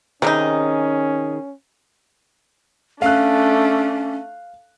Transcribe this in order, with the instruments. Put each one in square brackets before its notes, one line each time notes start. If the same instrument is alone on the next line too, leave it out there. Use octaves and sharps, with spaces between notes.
[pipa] C3 G3 D#4 [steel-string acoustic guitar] D#3 G#4 [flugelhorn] C#4
[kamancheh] A3 D4 [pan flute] C#4 [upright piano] F5 F#6